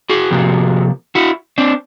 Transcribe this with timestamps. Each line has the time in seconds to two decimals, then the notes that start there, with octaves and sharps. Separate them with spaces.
0.10 F#4 G#4
0.31 C3 F3 A#3
1.15 E4 F#4
1.58 C4 D4